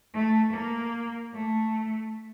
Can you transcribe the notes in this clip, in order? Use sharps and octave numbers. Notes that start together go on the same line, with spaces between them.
A3
A#3
A3